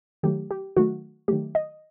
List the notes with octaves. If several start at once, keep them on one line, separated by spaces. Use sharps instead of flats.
D#3 F#3 A3 G4
G4
D#3 F#3 A3 F#4
D#3 F#3 A3 G4
D#5